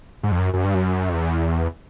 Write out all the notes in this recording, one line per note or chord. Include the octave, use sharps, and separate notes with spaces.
G#2
F2
F#2
F#2
G2
F#2
F2
E2